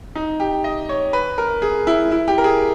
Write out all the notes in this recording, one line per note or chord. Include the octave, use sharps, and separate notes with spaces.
D#4
G4
D#5
C#5
B4
A#4
G#4
E4
E4
G4
A#4
G#4